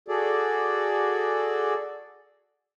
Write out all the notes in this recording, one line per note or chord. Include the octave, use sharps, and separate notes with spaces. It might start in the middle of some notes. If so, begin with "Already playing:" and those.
F#4 G#4 A4 D5